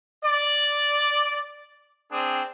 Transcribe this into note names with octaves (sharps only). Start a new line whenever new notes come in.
D5
C4 D4 G#4